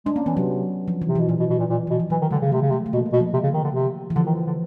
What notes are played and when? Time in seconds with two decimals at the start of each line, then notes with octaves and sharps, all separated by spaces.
0.05 G#3 D4
0.16 A#3 C#4
0.26 E3 B3
0.36 C3 F#3
0.88 F3
1.02 E3
1.08 C3
1.15 B2 E3
1.29 A#2 E3
1.40 B2
1.50 B2
1.59 A#2
1.70 A#2
1.87 B2 E3
2.00 F3
2.10 E3 F#3
2.22 D#3
2.31 D3 G#3
2.42 C#3
2.52 C3 A3
2.61 C#3
2.70 C3 A3
2.86 A3
2.93 B2 A#3
3.06 A3
3.13 B2
3.20 F3
3.33 C3
3.43 C#3
3.54 D#3
3.64 D3
3.74 C3
4.10 E3
4.16 D3 F3
4.26 D#3
4.35 D3
4.47 D3